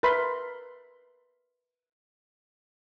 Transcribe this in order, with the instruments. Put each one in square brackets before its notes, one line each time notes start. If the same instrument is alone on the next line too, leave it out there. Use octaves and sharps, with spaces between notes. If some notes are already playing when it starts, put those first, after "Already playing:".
[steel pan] A#4 B4 E5 B5 C6